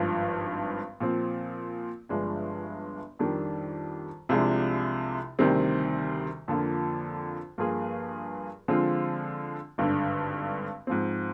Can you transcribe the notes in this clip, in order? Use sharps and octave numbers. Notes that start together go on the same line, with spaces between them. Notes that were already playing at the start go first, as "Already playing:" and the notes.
Already playing: G#1 G2 F3
A#2 F3 C4
G1 G2 F3 G#3 D4
F2 D#3 G3 D4
C2 C3 F3 G#3 D4
D2 C3 D#3 G3 C4
F2 D3 F3 A#3
G2 F3 A#3 F4 G#4
D3 F3 G#3 C4 F4
G#1 G2 D3
G#2 F3 C4